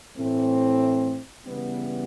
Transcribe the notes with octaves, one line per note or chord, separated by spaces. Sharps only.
A2 E3 A3 C4
C#3 E3 G3 B3